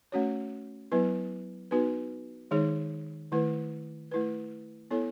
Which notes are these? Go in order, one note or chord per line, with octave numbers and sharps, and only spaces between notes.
A3 C#4 F#4 C#5
F#3 B3 E4 B4
B3 D#4 F#4 B4
D#3 G#3 D#4 G#4 C#5
D#3 A3 E4 B4
A3 E4 B4
B3 E4 A4 C#5